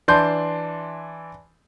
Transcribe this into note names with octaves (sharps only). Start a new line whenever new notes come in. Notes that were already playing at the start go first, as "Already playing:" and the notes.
E3 D4 A5 C6 G6